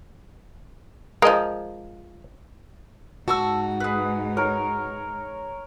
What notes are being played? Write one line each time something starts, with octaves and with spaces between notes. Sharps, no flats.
F3 G#3 A#4 D#5
G#2 D#4 F#4 A5 C#6 E6
G#4 B4
A#4 C#5